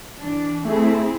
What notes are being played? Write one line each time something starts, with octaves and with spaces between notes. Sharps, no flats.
E3 D4
A3 C4 E4 G#4